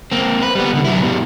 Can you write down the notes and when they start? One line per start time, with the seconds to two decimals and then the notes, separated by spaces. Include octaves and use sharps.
0.12 A#3 C4
0.42 B4
0.55 G3 B3
0.73 C2 D3
0.85 F#3 E4
1.01 B2 G3